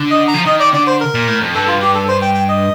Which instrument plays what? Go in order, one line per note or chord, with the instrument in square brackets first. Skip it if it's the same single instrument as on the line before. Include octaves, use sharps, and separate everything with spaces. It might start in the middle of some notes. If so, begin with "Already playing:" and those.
Already playing: [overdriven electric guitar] D3
[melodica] D#5
A#5
[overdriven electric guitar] F3
[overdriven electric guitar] D#3 [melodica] D#5
[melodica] D5
[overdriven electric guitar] D3 [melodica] D5
[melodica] C5
A#4
[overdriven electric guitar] A#2
A2
F2
[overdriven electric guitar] G2 [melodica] A4
[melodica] F4
G4
A4
C5
G5
G5
D#5